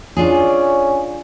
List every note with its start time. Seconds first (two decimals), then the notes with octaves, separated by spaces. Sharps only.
0.17 C#4 D4 F4 G#4